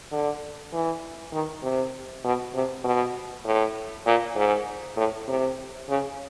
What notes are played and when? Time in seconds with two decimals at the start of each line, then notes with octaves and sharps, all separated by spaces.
0.12 D3
0.73 E3
1.33 D#3
1.63 C3
2.24 B2
2.54 C3
2.84 B2
3.45 A2
4.06 A#2
4.36 G#2
4.97 A2
5.28 C3
5.89 C#3